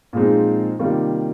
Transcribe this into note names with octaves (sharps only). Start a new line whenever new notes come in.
A#2 F3 G#3 C4 D#4
C3 D#3 G3 A#3 F4